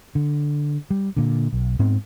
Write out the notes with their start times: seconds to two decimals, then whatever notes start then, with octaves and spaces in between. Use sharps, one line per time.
0.15 D3
0.90 G3
1.17 A#2 D3
1.53 B1
1.79 G#2 B3 C4